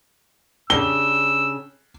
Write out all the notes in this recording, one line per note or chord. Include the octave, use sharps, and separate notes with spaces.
C#3 D4 G4 E6 G7